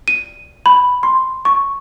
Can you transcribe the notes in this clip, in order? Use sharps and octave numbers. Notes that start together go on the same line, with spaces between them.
D#7
B5
C6
C#6